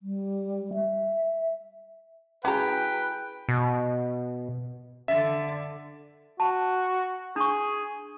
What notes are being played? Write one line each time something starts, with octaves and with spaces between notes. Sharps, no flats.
G3
E5
C#4 E4 F#4 G#4 B4 G5 A#5
B2
D3 E5
F#4 A5
D4 G#4 C#6